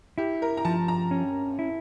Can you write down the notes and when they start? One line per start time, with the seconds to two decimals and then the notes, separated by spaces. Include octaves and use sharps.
0.18 E4 G4
0.42 A#4
0.57 A#5
0.65 F3 A5
0.88 A#5
1.11 C#4
1.59 E4